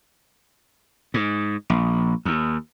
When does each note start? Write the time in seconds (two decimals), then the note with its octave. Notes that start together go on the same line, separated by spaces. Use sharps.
1.14 G#2
1.70 A#1
2.25 D#2